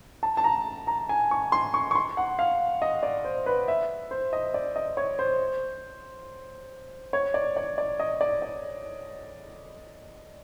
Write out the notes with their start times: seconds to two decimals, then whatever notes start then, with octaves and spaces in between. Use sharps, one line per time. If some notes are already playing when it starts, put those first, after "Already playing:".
0.23 A5
0.37 A5
0.44 A#5
0.87 A#5
1.09 G#5
1.31 C#6
1.52 C6
1.74 C#6
1.91 C#6
1.95 C6
2.17 F#5
2.39 F5
2.82 D#5
3.03 D5
3.25 C5
3.46 B4
3.68 E5
4.11 C5
4.33 D#5
4.54 D5
4.76 D#5
4.97 C#5
5.19 C5
7.13 C#5
7.34 D5
7.57 D5
7.78 D5
8.00 D#5
8.21 D5
8.42 D5